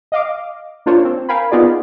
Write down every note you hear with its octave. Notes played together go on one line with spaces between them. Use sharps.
D#5 F5 D6
A#3 D4 F4 C5 C#5
C4
A#4 F5 G5 G#5 B5
B3 D#4 F4 G#4 D5